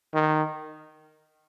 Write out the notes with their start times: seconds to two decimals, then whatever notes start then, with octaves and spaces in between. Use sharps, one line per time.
0.14 D#3